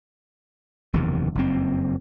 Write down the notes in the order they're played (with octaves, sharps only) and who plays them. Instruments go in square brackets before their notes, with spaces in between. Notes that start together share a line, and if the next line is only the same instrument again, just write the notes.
[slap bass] F#1 E2 C3 D#3
F#1 F2 C4